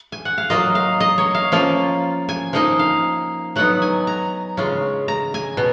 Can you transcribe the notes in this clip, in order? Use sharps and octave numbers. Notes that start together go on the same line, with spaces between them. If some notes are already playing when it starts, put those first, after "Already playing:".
Already playing: A#5
G#5
F#5
F5
F#3 A#3 F4 D#5
F5
D#5
C#5
F5
F3 A#3 C#4 F4
G#5
F3 A#3 D#4 D#5
F5
F#3 B3 D#4 F#5
G#5
A#5
C#3 G#3 C#4 F4
A#5
G#5
B2